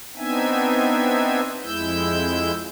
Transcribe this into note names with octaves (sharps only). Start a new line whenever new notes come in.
B3 C4 D4 D#4 E5 G#5
F2 G#3 E4 E6 G6